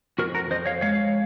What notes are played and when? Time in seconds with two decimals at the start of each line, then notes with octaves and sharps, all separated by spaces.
0.18 F2 F#4 A#4
0.35 F#4 A#4
0.50 F2 C5 D#5
0.66 C#5 F5
0.81 G#3 C#5 F5